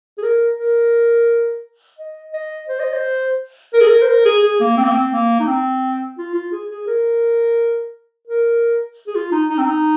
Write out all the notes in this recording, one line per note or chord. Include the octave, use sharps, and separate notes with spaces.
G#4
A#4
A#4
D#5
D#5
C5
D#5
C5
A#4
G#4
A#4
C5
A#4
G#4
G#4
A#3
C4
A#3
C4
A#3
D#4
C4
F4
F4
G#4
G#4
A#4
A#4
G#4
F4
D#4
D#4
C4
D#4